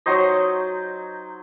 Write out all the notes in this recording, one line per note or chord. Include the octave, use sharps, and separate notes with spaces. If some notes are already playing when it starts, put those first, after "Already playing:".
F#3 D#4 C5 D#5